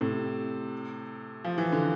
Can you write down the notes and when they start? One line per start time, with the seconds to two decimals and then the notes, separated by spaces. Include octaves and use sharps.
0.01 A2 C3
1.45 F3
1.58 E3
1.72 D3